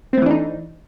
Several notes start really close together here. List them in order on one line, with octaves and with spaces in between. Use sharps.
C4 A3 E3 D4 D#4